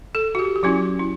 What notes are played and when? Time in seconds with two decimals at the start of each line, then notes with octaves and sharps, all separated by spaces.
0.15 A4
0.35 F#4
0.39 G4
0.56 G4
0.63 F#3 C#4 E4 F#4
0.99 E4